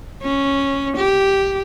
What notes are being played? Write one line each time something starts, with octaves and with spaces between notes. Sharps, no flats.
C#4
G4